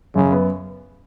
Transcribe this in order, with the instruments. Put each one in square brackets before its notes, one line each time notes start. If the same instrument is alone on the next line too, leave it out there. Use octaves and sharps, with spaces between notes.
[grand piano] F#2 [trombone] C#3
[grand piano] B3